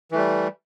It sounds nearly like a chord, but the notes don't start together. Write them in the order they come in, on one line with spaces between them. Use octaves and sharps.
E3 A3 G3